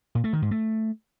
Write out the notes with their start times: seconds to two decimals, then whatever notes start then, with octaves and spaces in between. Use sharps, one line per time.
0.15 A#2
0.24 A3
0.33 D#3
0.42 G#2
0.51 A3